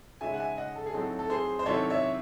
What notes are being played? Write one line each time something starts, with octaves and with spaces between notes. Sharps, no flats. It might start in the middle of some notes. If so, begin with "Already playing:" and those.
C#3 G#3 D#4 E5 G#5
F#5
E5 G#5
D#5 F#5
A4
G#4
A2 F#3 C4 D#4 A4
A4
G#4 C5
C5
C3 D#3 F#3 C#4 E4 A4 C#5
C#5 E5